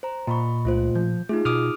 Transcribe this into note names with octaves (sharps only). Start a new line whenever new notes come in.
C5 A#5
A#2 D#5 B5 C#6
C#2 A3 F4 C5
F3 G6
A3 D#4 F4 G#4
B2 D6 D#6 F6